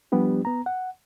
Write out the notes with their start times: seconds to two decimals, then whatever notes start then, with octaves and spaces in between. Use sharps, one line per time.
0.12 F3 G3 B3 D4 G4
0.45 B3 A#5
0.66 F#5